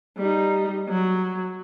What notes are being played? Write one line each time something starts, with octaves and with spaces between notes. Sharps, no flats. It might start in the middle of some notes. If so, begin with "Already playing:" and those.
G3 D#4
F#3